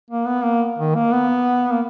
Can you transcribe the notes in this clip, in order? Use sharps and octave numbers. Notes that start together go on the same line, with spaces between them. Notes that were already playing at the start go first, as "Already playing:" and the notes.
A#3
B3
A#3
D#3
A#3
B3
A#3